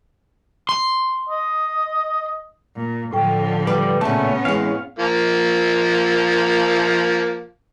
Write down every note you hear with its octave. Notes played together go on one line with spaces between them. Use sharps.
C6
D#5
A#2
A2 D3 F3 G5
G3 B4
A#2 C#3 A3 B3 C#4 A5
E3 G#3 F5
F3 A#3